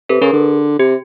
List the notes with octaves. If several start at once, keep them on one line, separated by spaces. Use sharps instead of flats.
C3 A4 B4
C#3 G#4 A#4
D3
C3 G4